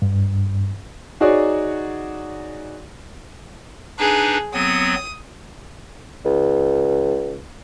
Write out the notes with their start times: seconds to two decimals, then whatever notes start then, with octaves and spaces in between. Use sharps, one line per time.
0.02 G2
1.20 D#4 F#4 G#4 C#5 D5
3.99 D4 D#4 G#4 B4
4.54 F#3 B3 C4 D#6
6.25 C#2